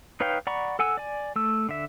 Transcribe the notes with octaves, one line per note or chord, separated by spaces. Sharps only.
D#4 B4 C#5 F5 G5
D5 F#5 A#5 B5 C#6
A4 F#5 G#5 E6
D5 G#5
A3 E6
D3 E5